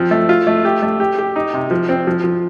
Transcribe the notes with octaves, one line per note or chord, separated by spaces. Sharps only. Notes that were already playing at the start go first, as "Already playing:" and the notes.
Already playing: F3 C4
A3
F4
A3
G4
A3
G4
G4
D#4
C3
F3
C4
F3
F3